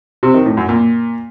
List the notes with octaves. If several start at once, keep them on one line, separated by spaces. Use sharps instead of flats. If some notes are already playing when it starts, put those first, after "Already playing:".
C3
D#3
A2
F#2
A#2